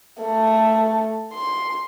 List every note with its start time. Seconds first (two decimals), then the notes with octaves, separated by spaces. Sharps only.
0.21 A3
1.33 C6